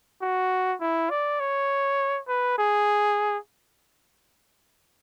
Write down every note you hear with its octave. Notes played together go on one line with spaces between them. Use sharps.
F#4
E4
D5
C#5
B4
G#4